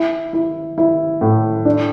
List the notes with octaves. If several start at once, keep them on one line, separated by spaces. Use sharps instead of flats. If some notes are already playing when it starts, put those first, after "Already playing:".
Already playing: E4
E4
E4
A2
D4